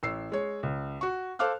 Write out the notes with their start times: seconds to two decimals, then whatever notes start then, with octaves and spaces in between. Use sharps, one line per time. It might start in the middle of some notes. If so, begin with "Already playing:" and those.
0.03 A1 E6 C7
0.32 G#3 C#5
0.63 C#2
1.01 F#4 C#6
1.39 A4 C5 F5 D6 F6 F#6